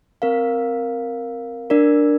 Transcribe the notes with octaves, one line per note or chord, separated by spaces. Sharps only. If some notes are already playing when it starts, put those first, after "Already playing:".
C4 A#4 F5
D4 A#4 D5